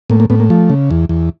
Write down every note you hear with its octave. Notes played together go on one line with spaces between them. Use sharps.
A2 A#3
A#3
A2 B3
A#3
F3 A3
C#3
E2
E2